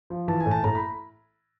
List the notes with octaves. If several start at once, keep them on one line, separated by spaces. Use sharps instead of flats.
F3
E3 A5
G#5
A2
A5
A2 A#5
B5